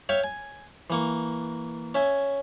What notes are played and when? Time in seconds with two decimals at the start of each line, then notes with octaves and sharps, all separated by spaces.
0.09 C#5 E5 F5 G5 C#6
0.24 G#5
0.90 E3 A#3 C#6
1.95 C#4 E5 G#5